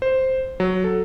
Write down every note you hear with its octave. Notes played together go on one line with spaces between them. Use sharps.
C5
F#3
A4